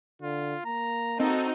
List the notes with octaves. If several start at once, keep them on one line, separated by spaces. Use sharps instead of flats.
D3 F4
A#3 A#5
C4 D#4 F#4 A4